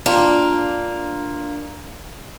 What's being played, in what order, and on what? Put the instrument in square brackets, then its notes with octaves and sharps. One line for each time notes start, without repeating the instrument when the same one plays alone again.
[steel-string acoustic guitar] A#3 [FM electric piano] D4 [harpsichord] F4 G5